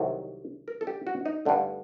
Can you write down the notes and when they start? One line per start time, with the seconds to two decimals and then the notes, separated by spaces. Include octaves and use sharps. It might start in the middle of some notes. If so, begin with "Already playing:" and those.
Already playing: C2 C3 D#3 F#3 A4
0.68 A#4
0.81 A4
0.87 G4
1.07 F#4
1.26 D#4
1.45 G2 D3 A3